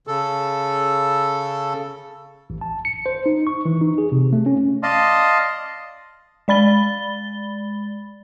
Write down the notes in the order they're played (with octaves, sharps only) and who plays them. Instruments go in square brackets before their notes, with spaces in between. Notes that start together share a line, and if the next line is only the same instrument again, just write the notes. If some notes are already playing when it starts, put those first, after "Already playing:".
[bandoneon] C#3 A4
[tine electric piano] A1
A5
C#7
C5
D#4
C#6
E3
D#4
G#4
C3
A3
C#4
[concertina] D5 D#5 F5 A5 C6 D#6
[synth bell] G#3 D5 B5 A6 G7